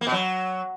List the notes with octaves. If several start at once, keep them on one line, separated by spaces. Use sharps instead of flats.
A#3
B2
F#3